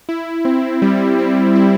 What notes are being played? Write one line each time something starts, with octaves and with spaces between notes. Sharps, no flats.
E4
C4
G3
C4
E4